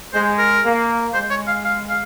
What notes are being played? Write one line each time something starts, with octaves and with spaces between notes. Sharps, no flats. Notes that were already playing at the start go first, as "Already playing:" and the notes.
G#3 C5
A#4
A#3
G#3 C5
C#5
F5
F5
F5